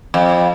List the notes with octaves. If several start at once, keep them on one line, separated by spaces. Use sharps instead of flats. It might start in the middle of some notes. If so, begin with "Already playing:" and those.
F2